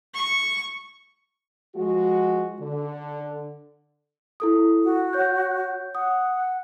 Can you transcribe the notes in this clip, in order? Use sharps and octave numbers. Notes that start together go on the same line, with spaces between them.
C#6
F3 G#3 F#4
D3
E4 A4 D#6
F#4
C#5 G6
F#5 D#6